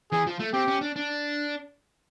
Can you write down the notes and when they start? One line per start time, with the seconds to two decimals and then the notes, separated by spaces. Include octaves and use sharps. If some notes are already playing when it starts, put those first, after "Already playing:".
0.12 E3 G#4
0.27 F3
0.40 A3
0.54 C4 G4
0.68 C#4
0.81 D4
0.96 D4